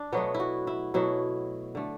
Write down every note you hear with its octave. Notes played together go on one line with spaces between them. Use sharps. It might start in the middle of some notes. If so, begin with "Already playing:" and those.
Already playing: D4
B2 F#3 A3 B3
E4
F#4
E4
B2 F#3 A3 E4
D3 A3